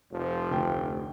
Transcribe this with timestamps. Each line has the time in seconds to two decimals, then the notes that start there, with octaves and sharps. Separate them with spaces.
0.12 F1 F3
0.51 D2 G5